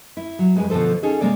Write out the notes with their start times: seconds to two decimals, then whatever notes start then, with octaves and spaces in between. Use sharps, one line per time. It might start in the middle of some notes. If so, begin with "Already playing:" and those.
0.17 E4
0.39 F#3
0.56 F2 G#3 F4 G#4 B4
0.70 B2 D3 F3 A4 C5
1.03 C#4 D#4 G#4 A4 F5
1.21 C3 G#3 A#3 D5